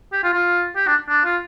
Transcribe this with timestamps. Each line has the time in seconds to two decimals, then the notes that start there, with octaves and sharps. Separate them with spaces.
0.13 G4
0.23 F4
0.33 F4
0.76 G4
0.87 D4
1.09 D4
1.25 F4